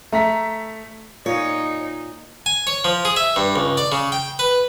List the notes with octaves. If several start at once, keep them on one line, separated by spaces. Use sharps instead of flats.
A3 A#5 B6
A#2 D#4 C#5
G#5
C#5
F3
G#4
E5
G2
C#2
D5
C#3
G5
B4